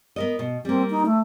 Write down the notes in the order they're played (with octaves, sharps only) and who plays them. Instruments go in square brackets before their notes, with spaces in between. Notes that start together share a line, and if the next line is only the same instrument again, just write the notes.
[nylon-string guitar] B3 A#4 D#5
B2
[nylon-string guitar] G3 A#3 [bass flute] C4
[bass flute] D#4
A3